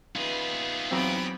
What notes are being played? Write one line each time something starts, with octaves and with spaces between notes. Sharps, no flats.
B3 D#4 F4 G#4 B4
E2 F#3 C4 B5 D6 D#6